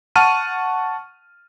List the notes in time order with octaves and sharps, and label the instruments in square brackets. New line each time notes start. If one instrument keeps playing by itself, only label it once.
[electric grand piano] F#5 A5 C#6 F6 D#7